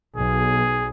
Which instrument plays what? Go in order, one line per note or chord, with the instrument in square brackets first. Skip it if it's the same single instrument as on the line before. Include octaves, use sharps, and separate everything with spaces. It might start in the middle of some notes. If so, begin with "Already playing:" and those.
[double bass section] B1 [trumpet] G#4